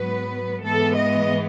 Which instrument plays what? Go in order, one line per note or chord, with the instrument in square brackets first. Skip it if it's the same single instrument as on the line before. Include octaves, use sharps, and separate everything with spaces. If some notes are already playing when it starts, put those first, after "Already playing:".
Already playing: [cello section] G#2 F#3 B3 B4
G#2 E3 G#3 B3 A4
D#5